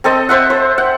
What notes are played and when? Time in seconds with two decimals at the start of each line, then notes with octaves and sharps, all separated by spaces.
0.04 C4 A4 D#5
0.29 C5 E5 F#5
0.50 C5
0.78 F#5